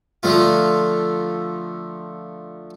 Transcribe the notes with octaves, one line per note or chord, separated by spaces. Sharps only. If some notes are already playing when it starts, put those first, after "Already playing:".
D3 F3 A3 F4